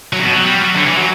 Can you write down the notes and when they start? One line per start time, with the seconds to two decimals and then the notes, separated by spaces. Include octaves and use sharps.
0.13 F#3
0.19 C#3
0.22 B2
0.33 F#3
0.44 G3
0.59 F#3
0.76 D3
0.86 E3
0.97 F#3